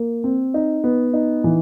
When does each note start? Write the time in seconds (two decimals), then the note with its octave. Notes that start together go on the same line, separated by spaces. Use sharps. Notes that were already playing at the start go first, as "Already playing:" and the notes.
Already playing: A#3
0.24 C4
0.54 D#4
0.84 B3
1.13 D#4
1.44 E3